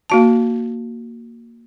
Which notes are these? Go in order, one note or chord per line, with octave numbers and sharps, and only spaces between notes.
A#3 F#4 A5